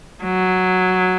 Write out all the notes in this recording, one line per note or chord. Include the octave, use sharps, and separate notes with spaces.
F#3